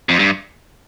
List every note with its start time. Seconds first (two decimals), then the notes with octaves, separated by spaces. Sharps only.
0.09 F2
0.19 G2